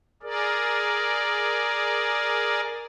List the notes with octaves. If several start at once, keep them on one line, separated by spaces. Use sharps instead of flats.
G#4 A#4 D5